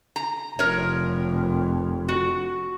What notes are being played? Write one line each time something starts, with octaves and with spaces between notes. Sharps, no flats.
A#5
F1 F2 A#4 C#5
F#4